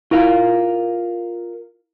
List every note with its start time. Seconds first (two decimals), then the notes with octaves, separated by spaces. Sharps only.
0.11 E4 F4 A#4 F5